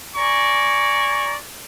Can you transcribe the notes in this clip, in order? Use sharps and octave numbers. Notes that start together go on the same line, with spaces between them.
D5 G#5 A#5 C#6